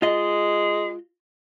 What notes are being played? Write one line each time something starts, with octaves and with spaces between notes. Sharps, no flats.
G#3 F4 D#5